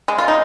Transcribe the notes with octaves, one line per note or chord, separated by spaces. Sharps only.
G#3
F4
D#4